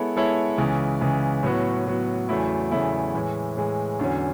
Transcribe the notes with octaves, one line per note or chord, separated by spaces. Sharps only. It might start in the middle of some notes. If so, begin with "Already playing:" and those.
Already playing: G#3 B3 E4 A4 C#5
G#3 B3 E4 A4 C#5
C#2 C#3 E3
C#2 C#3 E3
A2 F#3 B3 F#4
A2 F#3 B3 F#4
E2 C#3 F#3 A3 E4
E2 C#3 F#3 A3 E4
A2 E3 G#3
A2 E3 G#3
E2 D3 F#3 C#4